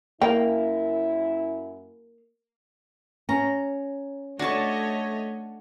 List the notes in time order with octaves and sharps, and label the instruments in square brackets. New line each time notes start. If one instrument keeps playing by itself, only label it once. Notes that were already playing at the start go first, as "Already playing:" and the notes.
[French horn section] F#2 E4 [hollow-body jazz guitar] A#3 [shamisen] G5
[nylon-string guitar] C#4 [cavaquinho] A#5
[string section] A3 C#5 D#5 [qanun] D4 A5 [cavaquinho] F#4 C#6